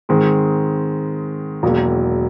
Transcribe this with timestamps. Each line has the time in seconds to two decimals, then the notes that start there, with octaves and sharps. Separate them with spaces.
0.09 G#2 D#3 G#3 C4
1.63 E1 E2 B2 F#3 A#3